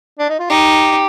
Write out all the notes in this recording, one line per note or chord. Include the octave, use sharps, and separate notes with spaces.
D4
D#4
F4
D#4 G4